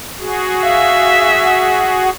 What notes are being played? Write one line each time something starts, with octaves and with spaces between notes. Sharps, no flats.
F#4 G#4
E5 F5
F#5